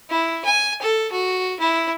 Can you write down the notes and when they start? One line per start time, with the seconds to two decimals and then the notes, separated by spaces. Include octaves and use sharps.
0.10 E4
0.45 G#5
0.82 A4
1.12 F#4
1.60 E4